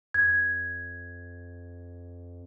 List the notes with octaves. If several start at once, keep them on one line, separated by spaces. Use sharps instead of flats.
F2 G#6